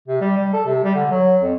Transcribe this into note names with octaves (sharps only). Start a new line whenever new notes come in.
C3
G3
G3
A4
C3
G3
D3
F#3
F2